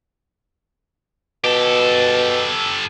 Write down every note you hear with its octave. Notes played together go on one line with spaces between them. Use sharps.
B2 G4 A4